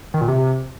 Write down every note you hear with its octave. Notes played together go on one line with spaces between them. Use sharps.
D#3
A#2
C3